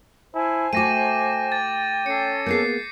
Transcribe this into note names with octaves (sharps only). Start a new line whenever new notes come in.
E4 C5 G#5 A5
A3 F#4 G5 D6 A#6 D#7
A6
C#4 A4 C#5 C7 C#7
A#3 B3 G#4 G6 C7